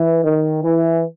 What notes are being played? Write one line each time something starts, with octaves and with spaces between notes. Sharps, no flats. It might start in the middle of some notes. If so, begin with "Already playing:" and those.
Already playing: E3
D#3
E3